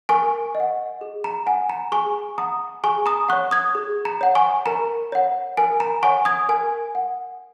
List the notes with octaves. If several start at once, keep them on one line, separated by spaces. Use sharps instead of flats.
A#4 G#5 C#6
D#5
F#5
G#4
A#5
F#5 G#5
A#5
G#4 G#5 C#6
F#5 A#5 D#6
G#4 G#5 C#6
A#5 D#6
C#5 F#5 C#6 F#6
D#6 G#6
G#4
A#5
C#5 F#5
G#5 C#6
A#4 A#5
C#5 F#5
A#4 G#5
A#5
C#5 F#5 G#5 C#6
D#6 G#6
A#4 G#5
F#5